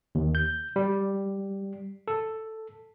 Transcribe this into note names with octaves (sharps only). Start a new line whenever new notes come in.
D#2
G6
G3
A4